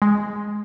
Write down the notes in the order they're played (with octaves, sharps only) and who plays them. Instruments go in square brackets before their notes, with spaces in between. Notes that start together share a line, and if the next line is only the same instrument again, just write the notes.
[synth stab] G#3